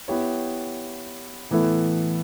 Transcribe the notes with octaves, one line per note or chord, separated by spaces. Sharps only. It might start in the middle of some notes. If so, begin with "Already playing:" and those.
B3 E4 G4 C#5
A2 E3 B3 E4 A4